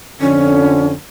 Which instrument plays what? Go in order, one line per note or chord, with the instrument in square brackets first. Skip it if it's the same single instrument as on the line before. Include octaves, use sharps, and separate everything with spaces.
[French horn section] F2 D3 [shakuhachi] C#4